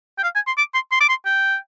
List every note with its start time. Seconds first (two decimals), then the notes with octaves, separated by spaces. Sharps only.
0.18 G5
0.23 F5
0.35 G#5
0.47 C6
0.58 D6
0.74 C6
0.92 C6
1.01 D6
1.09 C6
1.26 G5